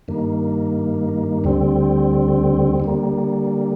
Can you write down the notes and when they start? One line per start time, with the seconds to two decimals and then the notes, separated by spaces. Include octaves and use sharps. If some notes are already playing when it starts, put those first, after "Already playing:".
0.08 G2 D#3 A#3
1.44 D2 D3 G3 C4
2.80 D3 G3 A#3